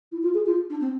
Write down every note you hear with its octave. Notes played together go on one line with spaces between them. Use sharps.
E4
F4
G#4
F4
D4
C4